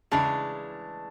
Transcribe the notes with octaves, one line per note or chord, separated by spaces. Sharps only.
C#3 E3 G#3 D4 A5